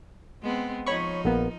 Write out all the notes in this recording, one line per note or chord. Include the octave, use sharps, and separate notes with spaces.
G#3 B3 C4
F3 D#4 C#5 B5 C#6
A#1 A#3 B3